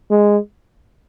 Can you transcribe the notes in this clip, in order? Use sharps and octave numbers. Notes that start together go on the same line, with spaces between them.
G#3